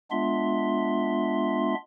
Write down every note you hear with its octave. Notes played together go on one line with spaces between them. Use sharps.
G#3 B3 D4 F4 E5 C6